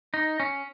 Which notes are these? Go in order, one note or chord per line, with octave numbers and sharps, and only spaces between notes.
D#4
C#4